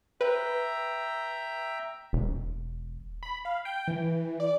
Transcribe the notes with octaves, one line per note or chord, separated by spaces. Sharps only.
B4 E5 G5 A#5
E1
B5
F5
G5
E3
D5